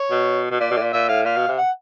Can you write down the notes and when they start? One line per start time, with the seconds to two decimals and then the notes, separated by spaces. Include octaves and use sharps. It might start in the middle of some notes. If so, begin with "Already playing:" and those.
Already playing: C#5
0.11 B2
0.51 B2
0.60 A#2 D5
0.71 B2
0.77 A2
0.81 A#2
0.93 A#2 E5
1.09 A2 F5
1.25 A#2 F5
1.37 B2
1.48 C3
1.58 F#5